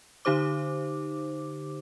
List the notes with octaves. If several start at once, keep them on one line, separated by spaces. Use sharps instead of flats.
D3 D#4 G4 C5 D6